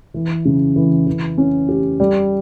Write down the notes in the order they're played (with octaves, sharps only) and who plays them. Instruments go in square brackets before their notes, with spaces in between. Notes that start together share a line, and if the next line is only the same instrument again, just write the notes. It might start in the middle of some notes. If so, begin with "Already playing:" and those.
[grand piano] E3
C#3
E3
E3
C#4
G4
G3